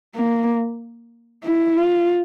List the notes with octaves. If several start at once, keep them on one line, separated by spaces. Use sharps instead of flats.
A#3
E4
F4